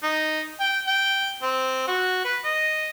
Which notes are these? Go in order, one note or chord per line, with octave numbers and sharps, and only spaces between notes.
D#4
G5
G5
C4
F#4
B4
D#5